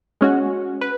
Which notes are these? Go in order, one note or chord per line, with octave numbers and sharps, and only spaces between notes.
G#3 C#4 F#4
B4